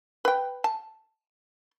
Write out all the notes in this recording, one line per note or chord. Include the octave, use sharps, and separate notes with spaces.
B4 G5
A5